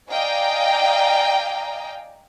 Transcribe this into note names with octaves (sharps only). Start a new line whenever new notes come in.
D5 D#5 F5 G5 G#5 A#5